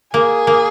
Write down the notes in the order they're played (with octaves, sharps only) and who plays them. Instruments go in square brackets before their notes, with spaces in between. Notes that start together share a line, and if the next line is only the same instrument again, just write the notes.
[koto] A#3 [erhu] G#4
[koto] A#3